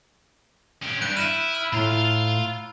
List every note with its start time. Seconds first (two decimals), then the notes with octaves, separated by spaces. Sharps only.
0.82 C#4 G4
1.01 G2 G3 F#6 G6 D7
1.17 E4 F6 D#7 E7
1.53 B5 E6 F6
1.73 A2 F4 F5 A#5